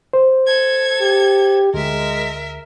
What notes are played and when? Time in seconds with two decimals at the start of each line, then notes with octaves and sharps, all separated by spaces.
0.13 C5
0.47 A4 G#6
1.01 G4
1.74 D2 G#3 A#4 E5